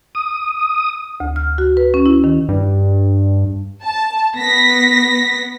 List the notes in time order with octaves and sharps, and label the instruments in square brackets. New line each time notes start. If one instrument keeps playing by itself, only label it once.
[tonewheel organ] D#6
[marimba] D2
F6
F#4
B4
C#4
E4
D#3
[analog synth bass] G2
[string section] A5
B3 A#6 B6